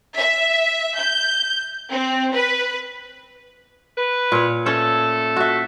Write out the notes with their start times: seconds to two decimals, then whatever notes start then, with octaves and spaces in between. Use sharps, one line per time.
0.17 E5
0.97 G6
1.89 C4
2.33 B4
3.98 B4
4.32 A#2 C#5
4.66 A3 C#4 A4
5.36 F#4 E5